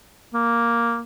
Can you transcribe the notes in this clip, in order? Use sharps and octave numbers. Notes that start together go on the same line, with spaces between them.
A#3